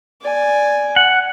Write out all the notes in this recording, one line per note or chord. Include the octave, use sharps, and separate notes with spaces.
D5 G#5
F#5